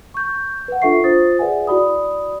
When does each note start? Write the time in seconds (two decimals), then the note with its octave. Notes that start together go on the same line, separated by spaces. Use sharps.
0.14 C#6 G6
0.68 B4 F#5
0.82 D4 F4 A4 E5 C#6 C7
1.04 F4 C5 D#6 A6
1.39 G#4 B4 D5 E5 F#5 G#5
1.67 E4 F#4 D5 B5 D#6